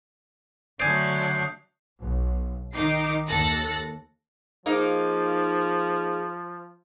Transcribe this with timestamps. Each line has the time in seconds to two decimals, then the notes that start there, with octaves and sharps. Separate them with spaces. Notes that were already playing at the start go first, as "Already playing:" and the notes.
0.80 D3 F#3 A3 D5 G#5 D#6 G6 C7
2.01 B1
2.74 D#3 D#4 D6 C7
3.28 D#2 A4 F#6 A6 A#6
4.66 F3 A#3 D#4 G#4 C5